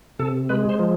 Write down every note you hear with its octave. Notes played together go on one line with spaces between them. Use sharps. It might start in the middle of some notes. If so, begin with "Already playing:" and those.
C3 A4
G#3 B4
C5
F3